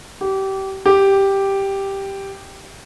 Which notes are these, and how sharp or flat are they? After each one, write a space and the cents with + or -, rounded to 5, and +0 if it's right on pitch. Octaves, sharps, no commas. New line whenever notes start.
G4 -25
G4 +0